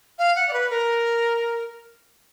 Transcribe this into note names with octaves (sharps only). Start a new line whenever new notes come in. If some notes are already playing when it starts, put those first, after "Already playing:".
F5
F#5
D5
B4
A#4